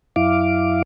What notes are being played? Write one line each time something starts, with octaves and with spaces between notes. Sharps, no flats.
F#2 E4 F5 D6